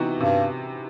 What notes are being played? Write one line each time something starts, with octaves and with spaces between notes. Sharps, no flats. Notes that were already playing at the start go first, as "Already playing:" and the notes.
Already playing: C3 E3 B3 D#4 F#4
G2 C3